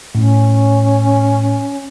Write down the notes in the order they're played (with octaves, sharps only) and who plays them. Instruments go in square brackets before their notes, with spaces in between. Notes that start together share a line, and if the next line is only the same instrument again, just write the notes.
[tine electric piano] A2 [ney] C#4